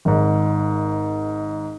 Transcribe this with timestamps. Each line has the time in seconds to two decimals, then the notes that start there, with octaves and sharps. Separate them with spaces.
0.05 G#1 G#2